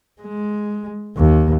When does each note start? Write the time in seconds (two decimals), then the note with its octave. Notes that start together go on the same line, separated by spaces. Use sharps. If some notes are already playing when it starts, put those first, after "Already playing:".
0.21 G#3
1.17 D#2